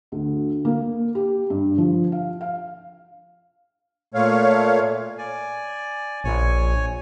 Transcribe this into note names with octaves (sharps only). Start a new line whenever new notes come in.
D2
A#3
G4
G2
F3
F5
F5
A#2 A3 C#5 F5
D5 G#5
A#1 C#5 G#5